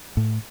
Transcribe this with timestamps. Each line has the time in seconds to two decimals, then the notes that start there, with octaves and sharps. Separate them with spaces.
0.17 A2